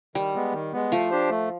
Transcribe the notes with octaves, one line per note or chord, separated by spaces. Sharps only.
D#3 G3
G#3 B3
D#3
G#3 B3
F3 A3
D4 G4 C5
A3